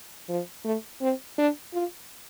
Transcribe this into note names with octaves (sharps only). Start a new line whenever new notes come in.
F3
A3
C4
D4
F4